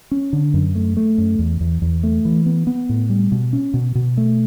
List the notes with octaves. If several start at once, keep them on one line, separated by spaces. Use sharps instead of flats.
C#4
D3
F#2
A3
A3
F#2
E2
E2
E2
A3
E3
B3
B3
A2
G3
B2
C#4
B2
B2
A3